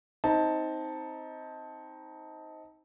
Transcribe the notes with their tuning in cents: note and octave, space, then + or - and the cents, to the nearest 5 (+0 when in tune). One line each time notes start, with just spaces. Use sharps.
C4 +0 D#4 +20 A5 +0